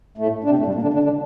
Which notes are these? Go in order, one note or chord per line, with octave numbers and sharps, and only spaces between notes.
A2 A3
D4
C3 C4
A2 A3
G2 G3
A#2 A#3
D3 D4
D3 D4
D3 D4